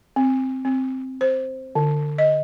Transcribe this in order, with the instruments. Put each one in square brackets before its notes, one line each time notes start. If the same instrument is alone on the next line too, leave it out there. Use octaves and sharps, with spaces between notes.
[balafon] C4
C4
C5
D3
D#5